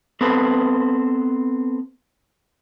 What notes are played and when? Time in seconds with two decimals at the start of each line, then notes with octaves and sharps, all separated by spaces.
0.21 B3 C4 A4 B4